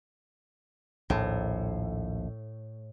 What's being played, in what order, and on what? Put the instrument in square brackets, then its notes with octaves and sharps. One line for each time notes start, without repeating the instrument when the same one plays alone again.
[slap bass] A#1 D#2 [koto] A2